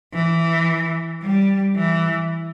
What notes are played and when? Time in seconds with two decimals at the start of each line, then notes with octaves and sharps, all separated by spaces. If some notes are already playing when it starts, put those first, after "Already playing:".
0.14 E3
1.23 G3
1.76 E3